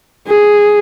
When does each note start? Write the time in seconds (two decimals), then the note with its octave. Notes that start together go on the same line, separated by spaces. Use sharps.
0.28 G#4